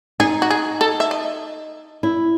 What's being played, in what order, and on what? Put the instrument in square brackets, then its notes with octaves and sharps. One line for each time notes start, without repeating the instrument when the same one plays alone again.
[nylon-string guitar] D#4 [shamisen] G#4
[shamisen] F#4
G#4
A4
E5
D#5
[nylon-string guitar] E4